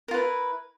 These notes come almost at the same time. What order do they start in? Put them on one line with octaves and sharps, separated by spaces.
A#4 F4 B4 E4